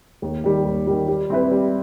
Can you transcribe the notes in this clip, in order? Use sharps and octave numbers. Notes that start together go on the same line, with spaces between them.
D#2
D#3 G3
D#2
D#3 G3
G3
C4 E4 B4
G3